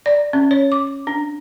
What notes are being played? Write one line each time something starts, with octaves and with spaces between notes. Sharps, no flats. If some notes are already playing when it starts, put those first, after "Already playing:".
D5
C#4
C#5
D6
D4